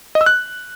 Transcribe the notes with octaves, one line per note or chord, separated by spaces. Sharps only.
D#5
E6
F#6